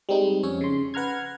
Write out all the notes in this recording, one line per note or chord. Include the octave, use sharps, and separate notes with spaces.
G3 G#3 C4 D#4
F2 C#4 C#5
C#3 C6
B4 F#5 A#5 F6 G#6